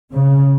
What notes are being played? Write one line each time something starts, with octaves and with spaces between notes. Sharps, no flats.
C#3